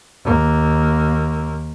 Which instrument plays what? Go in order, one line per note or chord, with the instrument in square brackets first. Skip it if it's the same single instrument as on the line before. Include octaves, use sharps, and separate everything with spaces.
[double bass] D#2 A#3